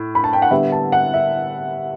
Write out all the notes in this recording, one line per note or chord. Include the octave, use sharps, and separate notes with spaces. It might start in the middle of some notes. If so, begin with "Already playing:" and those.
Already playing: A2
B5
A5
G5
F#5
D3 G3 B3 E5
A5
F#5
E5